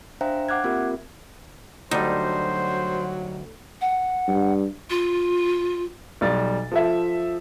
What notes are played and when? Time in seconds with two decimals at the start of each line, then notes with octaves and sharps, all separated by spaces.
0.21 D4 C5 E5 F5 G5 A#5
0.49 F#5 D6 F6 F#6 G#6
0.64 A#3 C4 F4 G4 A#4 E5
1.91 D2 F#3 G3 D#4 C5
3.81 F#5
4.28 G2
4.90 F4
6.21 B1 G3 A6
6.72 F3 A4 E5